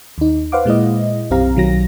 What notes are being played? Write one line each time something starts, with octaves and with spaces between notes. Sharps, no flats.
D#2 D#4
B4 C5 F5 F#5 D6
A#2 G#3 E4 D#5
B1 F#2 C4 G4 F5 A#5
B1 D#3 F#3 A#6